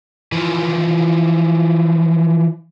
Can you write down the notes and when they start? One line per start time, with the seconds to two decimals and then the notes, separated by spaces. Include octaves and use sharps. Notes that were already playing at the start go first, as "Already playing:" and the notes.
0.32 E3 F3